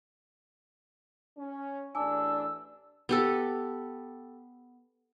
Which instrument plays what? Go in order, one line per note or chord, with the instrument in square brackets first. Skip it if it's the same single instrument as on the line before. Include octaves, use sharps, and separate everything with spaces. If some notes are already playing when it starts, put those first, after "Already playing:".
[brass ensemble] C#4
[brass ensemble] A1 E2 D4 [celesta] G#5 A5 D6 [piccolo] E6
[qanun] B3 G4 A4